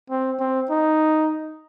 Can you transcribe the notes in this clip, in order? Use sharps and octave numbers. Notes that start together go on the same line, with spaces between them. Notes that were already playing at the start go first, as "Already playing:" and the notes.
C4
C4
D#4